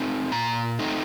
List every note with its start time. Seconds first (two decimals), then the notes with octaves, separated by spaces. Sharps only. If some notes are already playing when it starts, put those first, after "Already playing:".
Already playing: A3 C4 D#4
0.32 A#2 A#5
0.79 A3 C4 D#4